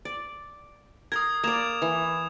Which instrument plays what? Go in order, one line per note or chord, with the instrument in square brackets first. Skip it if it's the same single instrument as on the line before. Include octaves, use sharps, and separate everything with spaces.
[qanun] D5
[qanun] A#4 C6 [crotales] D#6 G#6
[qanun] A#3 D5 [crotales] G#6 E7 F7
[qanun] E3